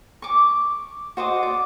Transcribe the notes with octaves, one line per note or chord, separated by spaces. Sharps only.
C#6 D6
F#4 C5 D#5 D6
D5